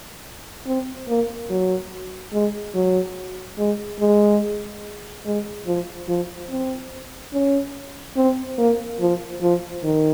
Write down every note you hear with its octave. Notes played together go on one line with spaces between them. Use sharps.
C4
A#3
F#3
G#3
F#3
G#3
G#3
G#3
F3
F3
C4
C#4
C4
A#3
F3
F3
D#3